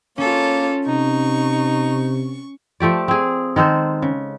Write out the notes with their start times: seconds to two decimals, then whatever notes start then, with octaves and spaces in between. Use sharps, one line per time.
0.18 A#3 C#4 F4 A4 C#5
0.88 C3 D#4 C#6
2.80 F3 A3 G4 D5
3.08 C4 G#4
3.56 D#3 G#3 A4 C5
4.02 C#3